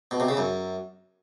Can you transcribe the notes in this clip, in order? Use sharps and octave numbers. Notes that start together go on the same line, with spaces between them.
B2
C3
C#3
F#2